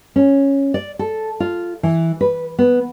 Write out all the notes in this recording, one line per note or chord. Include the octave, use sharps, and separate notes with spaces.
C#4
D5
A4
F4
E3
B4
B3